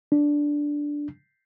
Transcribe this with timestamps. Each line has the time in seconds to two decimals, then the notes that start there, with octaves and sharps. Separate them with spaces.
0.12 D4